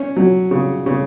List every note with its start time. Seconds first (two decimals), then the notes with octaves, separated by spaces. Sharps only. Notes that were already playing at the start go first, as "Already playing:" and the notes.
Already playing: C#4
0.17 F#3
0.51 C#3
0.86 C#3